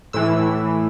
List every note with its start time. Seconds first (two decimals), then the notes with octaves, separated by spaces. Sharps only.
0.13 A2 E3 E6